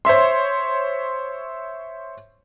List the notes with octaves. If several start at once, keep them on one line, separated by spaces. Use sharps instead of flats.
C5 C#5 E5 C6